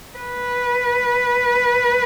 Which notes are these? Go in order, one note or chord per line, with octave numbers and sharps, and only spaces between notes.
B4